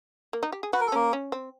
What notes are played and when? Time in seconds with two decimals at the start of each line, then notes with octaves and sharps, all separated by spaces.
0.33 A#3
0.43 D#4
0.52 G4
0.63 G#4
0.73 F#4 B4
0.80 A#4
0.87 A4
0.92 A#3 C#4 A#4
1.13 C#4
1.32 C4